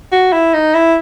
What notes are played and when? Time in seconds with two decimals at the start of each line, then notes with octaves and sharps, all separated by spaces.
0.12 F#4
0.33 E4
0.54 D#4
0.74 E4